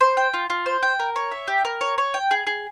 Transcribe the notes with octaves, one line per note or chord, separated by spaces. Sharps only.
C5
G5
F4
F4
C5
G5
A#4
C#5
E5
G4
A#4
C#5
C#5
G5
G#4
G#4